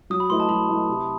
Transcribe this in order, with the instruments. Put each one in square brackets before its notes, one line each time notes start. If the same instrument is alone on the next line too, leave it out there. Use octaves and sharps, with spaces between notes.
[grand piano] F#3 [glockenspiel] D#6
[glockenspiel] B5
[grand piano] A3 E4 B4 D#5 [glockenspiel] C6
[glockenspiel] A5
[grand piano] F#3 [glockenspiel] B5
[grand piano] A3 E4 B4 D#5
C3